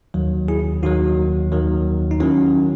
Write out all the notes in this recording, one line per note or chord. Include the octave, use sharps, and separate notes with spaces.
D#2 D#3 F#3
E4 G#4
D#2 D#3 F#3 D#4 F#4
D#2 D#3 F#3
D#4
D#3 F#3 C#4 E4